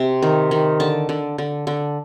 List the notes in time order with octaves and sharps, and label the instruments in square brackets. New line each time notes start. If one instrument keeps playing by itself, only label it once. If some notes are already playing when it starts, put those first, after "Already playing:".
Already playing: [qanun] C3
D#3
D#3
D3 A5
D3
D3
D3